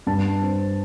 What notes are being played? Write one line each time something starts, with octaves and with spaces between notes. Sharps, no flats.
G2 A5
C4